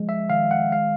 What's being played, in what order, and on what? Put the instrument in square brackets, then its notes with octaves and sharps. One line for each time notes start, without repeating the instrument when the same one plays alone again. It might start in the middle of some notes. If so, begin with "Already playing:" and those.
Already playing: [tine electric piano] F3 G#3
E5
D#3 F5
F#5
G#3 F5